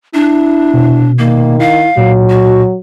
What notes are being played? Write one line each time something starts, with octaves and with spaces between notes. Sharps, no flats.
D4 E4
B2
D#3 A#3
E4 F5
A#2 F#3
F#4